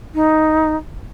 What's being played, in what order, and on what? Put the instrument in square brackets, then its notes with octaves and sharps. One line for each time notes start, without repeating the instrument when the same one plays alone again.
[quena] D#4